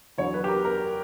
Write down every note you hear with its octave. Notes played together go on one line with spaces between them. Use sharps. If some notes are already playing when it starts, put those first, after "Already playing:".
E2 D3 F#3 C#5
B4
G4
A#4
A#4